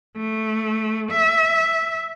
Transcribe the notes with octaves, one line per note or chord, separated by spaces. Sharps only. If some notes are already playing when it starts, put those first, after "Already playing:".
A3
E5